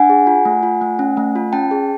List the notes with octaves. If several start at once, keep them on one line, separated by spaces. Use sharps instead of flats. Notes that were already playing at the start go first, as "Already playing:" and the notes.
Already playing: D4 F#5 G#5
G#4
F4
A3
F4
A3
C#4
A3
F4
C#4 G5 A5
G#4